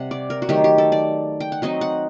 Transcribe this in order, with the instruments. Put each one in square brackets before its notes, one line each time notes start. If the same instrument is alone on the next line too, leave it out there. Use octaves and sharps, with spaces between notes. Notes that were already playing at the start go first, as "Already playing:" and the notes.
Already playing: [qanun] C3 G3 F#5
D5
A#4
F#4
D#3 F#3 A3 G4
G4
A4
D5
G5
F#5
F#3 C4 D#4 D#5
F#5